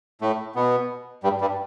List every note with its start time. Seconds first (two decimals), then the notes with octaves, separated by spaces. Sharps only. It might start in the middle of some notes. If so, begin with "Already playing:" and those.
0.22 A2 A3
0.55 B2 B3
1.24 G2 G3
1.41 G2 G3